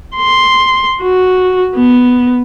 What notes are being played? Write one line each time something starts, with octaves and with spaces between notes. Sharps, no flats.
C6
F#4
B3